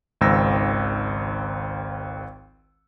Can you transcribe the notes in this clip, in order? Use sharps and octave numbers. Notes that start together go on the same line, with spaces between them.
G#1 C#2 D#3 C5 E6 A#6